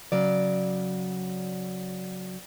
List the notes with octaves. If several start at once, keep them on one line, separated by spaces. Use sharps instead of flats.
C#3 F#3 D5